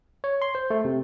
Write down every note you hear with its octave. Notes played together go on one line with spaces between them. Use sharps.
C#5
C6
C5
A3
C3